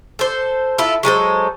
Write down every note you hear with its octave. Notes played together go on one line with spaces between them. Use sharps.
A4 C5
E4 F4 A4
F#3 G#3 A4 C5